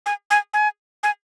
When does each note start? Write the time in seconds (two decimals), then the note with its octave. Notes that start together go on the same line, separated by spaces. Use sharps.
0.06 G#5
0.31 G#5
0.54 G#5
1.03 G#5